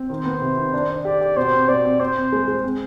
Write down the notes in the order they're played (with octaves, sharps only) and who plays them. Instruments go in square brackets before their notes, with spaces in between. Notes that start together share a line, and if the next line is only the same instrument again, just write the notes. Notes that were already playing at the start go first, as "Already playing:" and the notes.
Already playing: [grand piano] C4
[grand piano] D#3 [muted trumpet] C5
[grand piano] B3
C3
D#3
D4
D4
[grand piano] G4 [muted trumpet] D5
[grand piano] G4
[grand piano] B2 [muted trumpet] C5
[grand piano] C4
[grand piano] B2 [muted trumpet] D5
[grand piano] C4
[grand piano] C4 [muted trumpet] C5
[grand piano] C4
G#3
G#3
C4